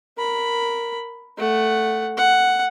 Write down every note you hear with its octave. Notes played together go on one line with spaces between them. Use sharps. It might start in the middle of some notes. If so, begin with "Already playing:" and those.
A#4 B5
A3 F#5
F#5